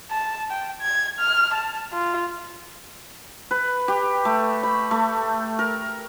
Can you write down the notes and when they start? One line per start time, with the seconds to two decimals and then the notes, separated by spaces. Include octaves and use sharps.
0.11 A5
0.51 G5
0.81 G#6
1.20 F6
1.54 A5
1.93 F4
3.51 B4
3.88 G4
4.25 A3
4.63 B5
4.91 A3
5.59 A#4